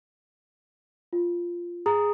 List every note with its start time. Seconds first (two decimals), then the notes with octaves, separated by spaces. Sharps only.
1.13 F4
1.86 G#4 A#5